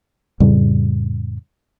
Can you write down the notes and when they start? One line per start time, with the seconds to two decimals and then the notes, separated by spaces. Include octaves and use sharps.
0.40 F2 A2 C#3 G3